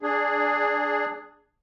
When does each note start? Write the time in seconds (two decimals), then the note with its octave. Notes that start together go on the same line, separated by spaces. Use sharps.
0.02 D4 G#4